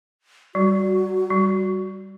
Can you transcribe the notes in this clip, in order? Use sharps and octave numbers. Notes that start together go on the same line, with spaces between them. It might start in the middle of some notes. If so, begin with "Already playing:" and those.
G3 F#4
G3